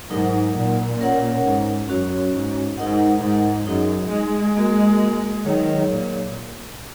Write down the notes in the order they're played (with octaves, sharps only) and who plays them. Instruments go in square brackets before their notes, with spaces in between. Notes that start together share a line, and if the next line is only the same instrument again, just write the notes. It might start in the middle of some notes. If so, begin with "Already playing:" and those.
[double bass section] G#2 [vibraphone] F#3 D#4 A#4 F#5
[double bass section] A#2
[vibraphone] C#4 A#4 C#5 F#5
[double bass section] G#2
[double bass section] F#2 [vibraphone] C#4 F#4 C#5
[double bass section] G#2
[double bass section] G#2 [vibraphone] D#4 A#4 D#5 F#5
[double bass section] G#2
[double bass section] F#2 [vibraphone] D#4 G#4 D#5
[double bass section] G#3
[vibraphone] A#3 F#4 A#4 D#5
[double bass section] D#3 [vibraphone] F#3 D#4 G#4 C#5
[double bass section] A#2